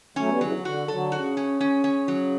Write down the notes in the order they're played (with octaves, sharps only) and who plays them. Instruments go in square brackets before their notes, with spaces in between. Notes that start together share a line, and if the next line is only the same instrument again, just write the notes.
[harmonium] F#3 A3 [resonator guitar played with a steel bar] C#4
[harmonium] G3 B3
[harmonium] C#3 E3 [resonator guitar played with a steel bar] F#3
[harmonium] D3
[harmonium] D3 [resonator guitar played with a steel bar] F#4
[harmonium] D3 F#3 [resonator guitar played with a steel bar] A4
[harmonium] C#3 [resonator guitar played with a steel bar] F#4
[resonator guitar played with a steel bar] C#4
C#4
C#4
F#3